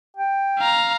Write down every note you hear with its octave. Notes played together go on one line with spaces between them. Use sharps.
G5
F5 A#5